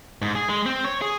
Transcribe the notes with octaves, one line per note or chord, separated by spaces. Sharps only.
G#2
G#4
G#3
C4
C#5
G#4